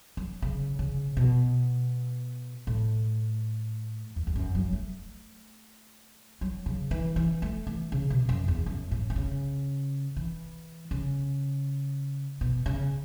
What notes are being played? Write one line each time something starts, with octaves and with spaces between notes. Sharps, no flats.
F#3
C#3
C#3
B2
A2
E2
E2
F#2
F#3
A3
F#3
C#3
E3
E3
A3
E3
C#3
B2
F#2
E2
F#2
A2
E3
C#3
E3
C#3
B2
C#3